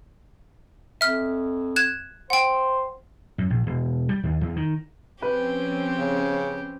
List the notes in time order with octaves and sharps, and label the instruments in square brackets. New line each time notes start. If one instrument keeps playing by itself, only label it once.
[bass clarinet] F2 [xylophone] E5 F6
[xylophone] F#6 G#6 E7
[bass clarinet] C5 [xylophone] F#5 G5
[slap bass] F#2
A#1
E1
G3
D#2
E2
D#3
[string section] F3 C4 C#4 [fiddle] G4 [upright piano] B4
[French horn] C#3